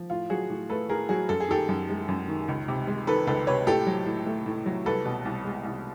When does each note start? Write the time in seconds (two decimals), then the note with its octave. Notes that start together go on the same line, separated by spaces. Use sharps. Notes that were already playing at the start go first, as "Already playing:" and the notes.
Already playing: F3
0.10 A2 F4
0.30 F#3 F#4 G#4
0.50 A2
0.69 A3 A4 B4
0.89 A2 G#4 A#4
1.09 F#3 F#4 G#4
1.29 F#2 A4
1.40 G#4
1.48 D#3 G4 A4
1.69 F#2
1.89 G#3
2.08 F#2
2.28 D#3
2.48 C#2
2.68 C3
2.87 G#3
3.07 D#3 A4 B4
3.27 C#2 A4 B4
3.47 C3 B4 C#5
3.67 A2 G4 A4
3.87 F#3
4.06 A2
4.26 A3
4.46 A2
4.66 F#3
4.86 C2 A4 B4
5.05 B2
5.25 C2
5.45 G#3
5.65 C2